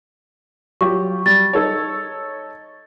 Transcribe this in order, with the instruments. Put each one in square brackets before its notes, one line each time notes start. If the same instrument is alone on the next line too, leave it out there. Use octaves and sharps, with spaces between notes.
[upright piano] F#3 F4 G4 [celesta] C#6
[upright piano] G3 [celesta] A6
[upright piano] D#4 A4 C#5